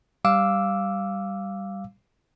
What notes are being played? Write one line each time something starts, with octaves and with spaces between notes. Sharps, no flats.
G3 F5 D6 E6